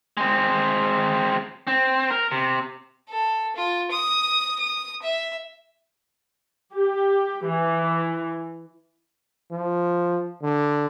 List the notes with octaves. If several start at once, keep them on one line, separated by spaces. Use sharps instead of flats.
G#3 C4
C4
A#4
C3
A4
F4
D#6
D#6
E5
G4
E3
F3
D3